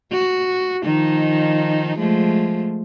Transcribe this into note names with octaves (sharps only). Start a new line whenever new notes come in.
F#4
D#3 F3 D#4
F3 G#3 A3